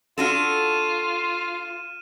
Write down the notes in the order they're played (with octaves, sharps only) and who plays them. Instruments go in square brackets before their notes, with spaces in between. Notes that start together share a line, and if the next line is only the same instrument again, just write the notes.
[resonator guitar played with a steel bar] D4 F#4 A4 [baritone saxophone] F4 [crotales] F6 D#7 E7